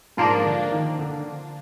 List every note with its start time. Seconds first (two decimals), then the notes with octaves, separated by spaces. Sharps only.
0.17 G#2 F3 A#3 D4
0.44 D3
0.72 D#3
0.99 D3